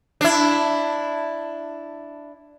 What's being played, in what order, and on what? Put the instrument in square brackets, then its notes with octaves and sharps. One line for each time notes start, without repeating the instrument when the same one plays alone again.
[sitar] D4 E4